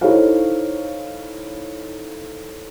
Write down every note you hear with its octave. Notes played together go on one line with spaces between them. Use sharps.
D#4 E4 A4 C5 C#5 F5